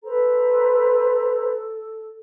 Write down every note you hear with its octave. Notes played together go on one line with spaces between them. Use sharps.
A4 B4 C5 A#5